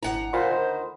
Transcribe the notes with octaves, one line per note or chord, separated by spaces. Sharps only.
G#1 D2 E4 F#5 A#5
A#2 F4 C5 B5 C6
D#3